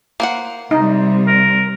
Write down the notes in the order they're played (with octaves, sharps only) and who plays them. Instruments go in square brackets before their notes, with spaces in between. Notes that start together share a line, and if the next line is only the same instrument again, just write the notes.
[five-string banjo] A#3 C5 F#5
[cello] C3 G3 [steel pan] D#4
[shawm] A#4